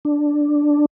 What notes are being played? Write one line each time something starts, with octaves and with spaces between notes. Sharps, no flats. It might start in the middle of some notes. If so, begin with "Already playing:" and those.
D4